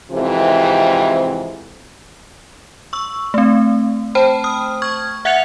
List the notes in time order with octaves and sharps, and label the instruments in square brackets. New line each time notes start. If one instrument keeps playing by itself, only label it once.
[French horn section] F2 G#2 C3 E3
[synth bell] C#6 E6
A3 C4
C5 G5 A5 B5
D#6 F6
C#6 F6 G#6
E5 F#5 F#6 G#6 C#7 F7